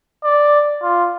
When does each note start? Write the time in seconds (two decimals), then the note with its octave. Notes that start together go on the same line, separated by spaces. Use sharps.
0.24 D5
0.83 F4